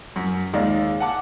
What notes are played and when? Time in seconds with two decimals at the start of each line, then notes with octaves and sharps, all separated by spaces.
0.16 F#2
0.53 D#2 G#3 D5 F5
1.00 F#5 A5 D6